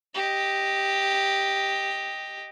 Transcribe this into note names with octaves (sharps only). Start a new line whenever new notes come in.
G4 D#5